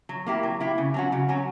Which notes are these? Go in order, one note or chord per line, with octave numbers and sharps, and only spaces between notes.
F#3
A#3 E4 G4
F#3
A#3 E4 G4
C#3
F#3 C#4 F#4
C#3
F#3 C#4 F#4